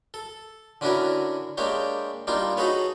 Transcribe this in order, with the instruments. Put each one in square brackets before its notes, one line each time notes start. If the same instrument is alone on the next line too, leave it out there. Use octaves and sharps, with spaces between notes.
[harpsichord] A4
D3 C#4 D4 E4 F#4 A#4
G#3 A#3 D4 G4 C#5
G3 A#3 D4 D#4 F4
D#4 F#4 G#4 A4 B4 C#5